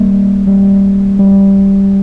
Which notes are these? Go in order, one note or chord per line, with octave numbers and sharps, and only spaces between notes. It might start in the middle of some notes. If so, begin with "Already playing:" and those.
Already playing: G3 A#3
G3
G3